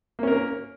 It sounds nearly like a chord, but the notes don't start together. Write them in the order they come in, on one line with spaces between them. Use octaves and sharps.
A#3 C#4 A#4